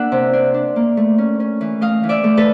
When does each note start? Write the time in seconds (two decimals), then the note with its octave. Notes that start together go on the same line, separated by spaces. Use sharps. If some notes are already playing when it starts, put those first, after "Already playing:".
Already playing: A#3 D4 E5 F#5
0.12 C3
0.33 D4
0.54 D4
0.76 A#3
0.97 A3
1.18 C#4
1.40 C#4
1.61 E3
1.81 A3 D#5 F5
2.03 E3
2.09 D5 E5
2.24 A3
2.37 A4 B4